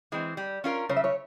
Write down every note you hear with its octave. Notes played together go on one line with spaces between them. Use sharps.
E3 G#3 C4
G3
C#4 F4 A#4
C#3 C#5
E5
C#5